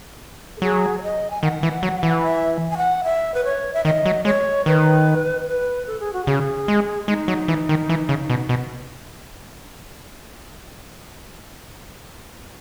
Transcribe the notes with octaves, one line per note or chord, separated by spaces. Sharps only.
A4
F#3 G#4
C#5
D#5
G#5
D#3 F#5
E3
F#3
E3
E5
G#5
F#5
E5
B4
C#5
E5
D#3 D#5
F#3
G#3 C#5
D#3 B4
B4
A4
G#4
F#4
C#3 G#4
G#3
G#3 D#4
F#3
E3
D#3
E3
C#3
B2
B2